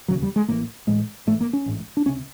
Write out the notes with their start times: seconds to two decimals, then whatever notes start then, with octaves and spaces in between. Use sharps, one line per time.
0.08 E1 D#2 C#3 F#3
0.23 G3
0.36 G#3
0.48 A1 A2 A#3
0.87 A1 A2 G#3
1.27 A1 G#2 A3
1.41 A#3
1.53 C#4
1.66 A1 G#2
1.97 D4
2.05 C#2 C3 C#4